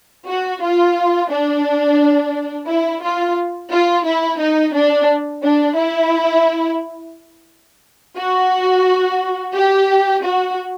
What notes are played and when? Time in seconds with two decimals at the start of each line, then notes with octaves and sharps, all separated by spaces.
0.28 F#4
0.62 F4
1.31 D4
2.68 E4
3.03 F4
3.71 F4
4.05 E4
4.40 D#4
4.74 D4
5.43 D4
5.77 E4
8.18 F#4
9.55 G4
10.24 F#4